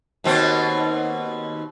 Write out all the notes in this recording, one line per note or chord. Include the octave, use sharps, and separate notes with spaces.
D#2 B2 C4